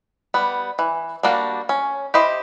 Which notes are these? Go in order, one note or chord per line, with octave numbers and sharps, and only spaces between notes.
G3 B3
E3
G3 A#3 D4 F#4
C#4
E4 G4 C5 D#5